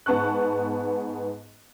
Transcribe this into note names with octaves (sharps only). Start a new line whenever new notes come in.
G#2 B3 A5 C#6 F#6